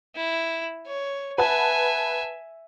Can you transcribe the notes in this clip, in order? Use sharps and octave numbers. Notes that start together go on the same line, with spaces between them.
E4
C#5
B4 E5 F#5 G#5 A5